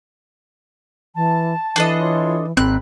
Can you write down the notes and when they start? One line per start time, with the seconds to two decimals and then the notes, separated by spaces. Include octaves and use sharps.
1.15 E3 A5
1.76 E3 D4 A4 D#5
2.00 F4 C#5 C6
2.57 G#1 D#2 C4 B5 F#6